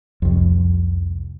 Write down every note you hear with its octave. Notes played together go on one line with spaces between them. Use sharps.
C2 F2